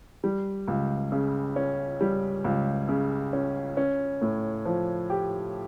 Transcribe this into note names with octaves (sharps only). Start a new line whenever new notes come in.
G3
C#2
C#3
C#4
G3
C#2
C#3
C#4
C#4
A2
F3
G4